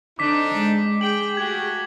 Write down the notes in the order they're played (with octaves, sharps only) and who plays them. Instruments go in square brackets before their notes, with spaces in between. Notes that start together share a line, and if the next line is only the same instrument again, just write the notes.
[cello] D3 [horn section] C4 D4 D#4 [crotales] D6 B6
[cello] G#3
[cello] G#4 [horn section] G5 [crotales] F#7
[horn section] A3 F#4 G4 [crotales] G#6